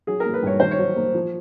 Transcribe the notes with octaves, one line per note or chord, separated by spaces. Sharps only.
F#3 G#4
A#4
A#3
B4
G2 C#5
D#3 C5
C#5
F#3
A#3
F3